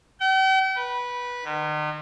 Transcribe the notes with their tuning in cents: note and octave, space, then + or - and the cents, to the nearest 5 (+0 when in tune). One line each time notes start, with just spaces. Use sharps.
G5 -45
B4 -15
D#3 -40